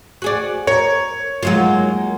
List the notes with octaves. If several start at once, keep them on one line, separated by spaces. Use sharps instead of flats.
F#4 G#4 D5
A#4 C#5
F#3 G#3 A#3 D#4 F4 A#4